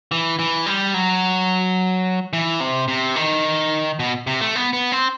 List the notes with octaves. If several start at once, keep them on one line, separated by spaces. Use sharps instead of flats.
E3
E3
G3
F#3
E3
C3
C3
D#3
B2
C3
A3
B3
B3
C4